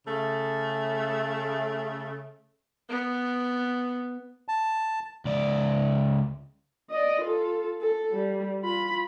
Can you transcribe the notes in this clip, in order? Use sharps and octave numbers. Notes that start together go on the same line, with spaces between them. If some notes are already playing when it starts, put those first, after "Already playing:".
C#3 A3
B3
A5
C#2 D5
D5 D#5
F4 A4
A4
G3
F4 B5